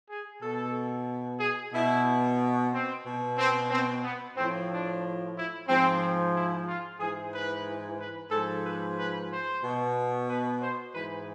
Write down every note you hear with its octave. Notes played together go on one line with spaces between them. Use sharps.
G#4
B2 A4
G#4
B2 E4
C4
B2
C4
C4
B3
A2 F3 C4
D4
E4
G#2 F3 C4
E4
F4
G#2 E3 G#4
B4
B4
G#2 F3 A4
B4
B4
C5
B2
B4
C5
G#2 E3 B4